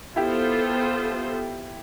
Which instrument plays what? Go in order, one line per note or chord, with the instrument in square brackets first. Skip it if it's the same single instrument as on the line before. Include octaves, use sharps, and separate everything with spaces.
[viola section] B3 F4 A4 C5 [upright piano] E4 G4